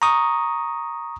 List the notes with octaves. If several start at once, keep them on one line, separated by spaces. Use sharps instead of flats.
A#5 C#6 D#6